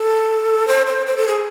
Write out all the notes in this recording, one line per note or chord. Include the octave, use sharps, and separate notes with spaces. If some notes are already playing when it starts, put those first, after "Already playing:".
Already playing: A4
C5
C5
C5
A4
G#4